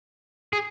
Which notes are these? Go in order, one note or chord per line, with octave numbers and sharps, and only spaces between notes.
G#4